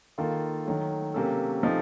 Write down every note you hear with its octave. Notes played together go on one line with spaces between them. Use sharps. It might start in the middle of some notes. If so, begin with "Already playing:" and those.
D#3 A#3 F4 A4
D#3 F#3 A3
C3 F#3 A#3 C#4 A4
C3 F3 A3 D#4